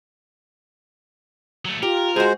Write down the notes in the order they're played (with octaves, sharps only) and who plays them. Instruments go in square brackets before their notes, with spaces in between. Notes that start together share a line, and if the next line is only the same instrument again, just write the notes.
[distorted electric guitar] F#3 A3
[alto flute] F4 [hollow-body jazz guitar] G4 [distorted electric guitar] A#4
[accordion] G#3 C5 [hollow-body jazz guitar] F#4 G#4